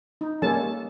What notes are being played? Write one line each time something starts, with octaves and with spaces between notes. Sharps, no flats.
D#4
G3 G#3 A#3 C#4 A4 A5